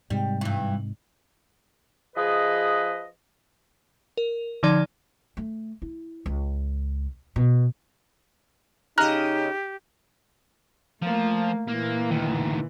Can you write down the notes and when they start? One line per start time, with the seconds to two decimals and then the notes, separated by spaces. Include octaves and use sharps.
0.10 G#2 C3 G3 G#3
0.41 G2 E3
2.17 F3 G#4 B4 D#5
4.17 A#4
4.63 D3 F3 D#4 D5 G#6
5.37 A3
5.82 E4
6.26 C#2
7.36 B2
8.98 C#3 D#4 G4 D#5 A#5 F6 F#6
11.02 F3 A3 A#3
11.68 A#2 E3 A#3
12.11 D2 D#3